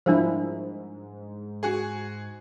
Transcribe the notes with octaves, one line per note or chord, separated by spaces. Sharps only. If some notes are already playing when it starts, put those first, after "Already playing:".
G#2 F3 G3 D4 E4 A#4 C5
F#4 G#4